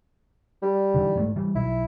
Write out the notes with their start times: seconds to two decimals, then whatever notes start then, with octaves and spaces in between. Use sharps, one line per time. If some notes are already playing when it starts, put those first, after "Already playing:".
0.62 G3
0.94 D3 E3
1.16 G#2 G#3 A3
1.36 E3 G3
1.55 B1 E4